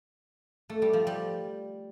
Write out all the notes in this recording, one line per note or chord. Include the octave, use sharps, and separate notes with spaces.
A3
G3
F3
G3